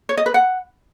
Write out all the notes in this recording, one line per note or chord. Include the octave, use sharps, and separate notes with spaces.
C#5
D#5
B4
F#5